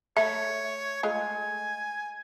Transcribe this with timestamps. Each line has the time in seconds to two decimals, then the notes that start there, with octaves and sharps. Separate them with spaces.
0.17 A3 C#5 E5
1.03 G#3 A3 F4 G#5